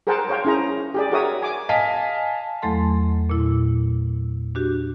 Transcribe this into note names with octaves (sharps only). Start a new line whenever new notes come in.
G#4 A#4 C5 F#5 G5 A5
C5 C#5 F5 G5
C#4 E4 G#4 A#5
G4 G#4 D5
F#4 G#4 A#4 C#5 E5 D#6
G#5 D6
D#5 F5 G#5 A5 B6
E2 F#3 A3 A4 C6
A#2 E4
D4 F#4 G4